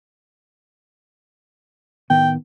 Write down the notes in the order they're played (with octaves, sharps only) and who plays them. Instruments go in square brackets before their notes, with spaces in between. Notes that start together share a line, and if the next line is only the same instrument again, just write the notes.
[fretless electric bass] A2 D#3 B3 [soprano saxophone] G5